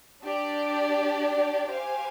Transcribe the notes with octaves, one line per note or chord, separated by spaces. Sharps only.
D4 G4 D5
G4 C5 F5 G#5